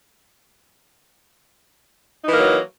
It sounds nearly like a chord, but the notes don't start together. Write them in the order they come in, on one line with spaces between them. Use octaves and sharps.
D#4 E3 A#3 F#3